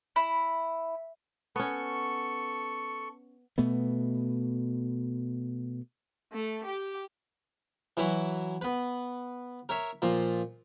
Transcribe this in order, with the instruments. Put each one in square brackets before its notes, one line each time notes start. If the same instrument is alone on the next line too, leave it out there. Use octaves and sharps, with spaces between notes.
[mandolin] E4
[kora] B3 C#4 [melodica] A4 C#6
[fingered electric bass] B2 A3 B3
[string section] A3
G4
[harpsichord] E3 F#3 E4 F#4
B3 B4
A#4 C#5 E5
A#2 F3